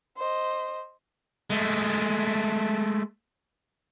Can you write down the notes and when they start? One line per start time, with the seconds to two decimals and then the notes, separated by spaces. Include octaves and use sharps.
0.17 C5 D#5
1.50 G#3 A3